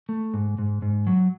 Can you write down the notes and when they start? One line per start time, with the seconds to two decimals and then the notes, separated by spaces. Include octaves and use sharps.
0.09 A3
0.34 G#2
0.58 G#2
0.82 G#2
1.07 F#3